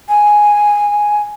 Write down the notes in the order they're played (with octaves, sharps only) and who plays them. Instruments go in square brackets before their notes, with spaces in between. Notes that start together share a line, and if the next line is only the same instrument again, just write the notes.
[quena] G#5